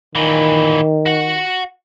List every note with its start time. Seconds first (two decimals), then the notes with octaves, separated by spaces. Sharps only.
0.15 A#2 D#3 E3
1.06 F#4 F#5